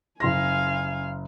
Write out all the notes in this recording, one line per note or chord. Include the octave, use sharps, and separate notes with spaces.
F#1 F5 G#5 C6 A#6